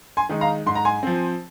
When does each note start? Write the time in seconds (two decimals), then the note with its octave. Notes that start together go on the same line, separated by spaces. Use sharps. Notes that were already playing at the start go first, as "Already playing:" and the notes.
0.17 G#5 C6
0.29 D#3 G#3 D#4
0.41 F5 A#5
0.66 G#2 C6
0.75 A#5
0.85 G#5 C6
1.03 F3 C4